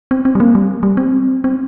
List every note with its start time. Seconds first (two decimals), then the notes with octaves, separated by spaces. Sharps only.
0.11 C4
0.25 C4
0.35 G3
0.40 A#3
0.55 G3
0.83 G3
0.97 C4
1.44 C4